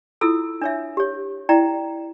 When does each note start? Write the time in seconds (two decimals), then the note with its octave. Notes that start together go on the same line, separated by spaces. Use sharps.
0.21 E4 F4 A4 E6
0.62 D4 C#5 E5
0.97 G4 C#5
1.49 E4 D5 G5 A#5